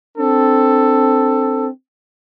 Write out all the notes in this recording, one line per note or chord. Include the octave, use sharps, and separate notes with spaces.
C4 D4 A4